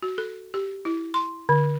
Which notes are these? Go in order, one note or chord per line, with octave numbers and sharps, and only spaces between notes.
F#4
A4
G4
E4
C6
D3